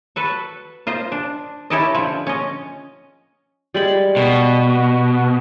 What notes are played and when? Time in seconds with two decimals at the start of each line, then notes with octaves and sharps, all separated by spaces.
0.16 F#4 A4 B4
0.87 F4 C5 D#5
1.12 D4
1.70 C#4 E4 G4 A4 D#5
1.94 D3 F3
2.27 C#4 D#5
3.74 G3 G#3 B5
4.17 B2